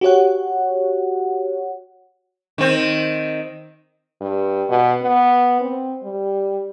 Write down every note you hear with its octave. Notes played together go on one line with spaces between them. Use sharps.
F#4 G4 C#5 F#5
D#3 C4
G2
B2
B3
C4
G3